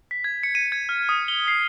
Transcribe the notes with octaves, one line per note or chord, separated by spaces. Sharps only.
B6
G#6
C#7
D#7
G#6
F6
D#6
G7
C7